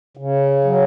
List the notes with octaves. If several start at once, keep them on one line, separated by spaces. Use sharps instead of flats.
C#3
F#3